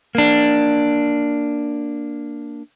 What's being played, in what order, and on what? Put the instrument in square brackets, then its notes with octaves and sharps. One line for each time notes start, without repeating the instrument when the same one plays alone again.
[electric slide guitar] A#3 D4